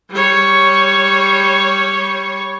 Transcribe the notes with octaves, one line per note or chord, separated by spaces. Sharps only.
G3 C#5